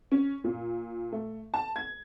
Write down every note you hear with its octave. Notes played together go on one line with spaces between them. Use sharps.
C#4
A#2
A3
A5
G#6